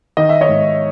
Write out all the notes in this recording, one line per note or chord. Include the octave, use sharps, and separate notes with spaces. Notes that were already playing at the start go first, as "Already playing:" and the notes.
D#3 D#5
E5
C#5 D#5
G#2